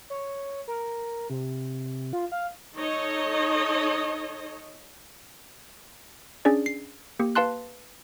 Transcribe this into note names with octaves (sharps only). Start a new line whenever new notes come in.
C#5
A#4
C3
F4
F5
D#4 A4 C#5 D#5
C#4 D4 G#4 D5
C7
A#3 G4
B4 F5 A5 C6 F#6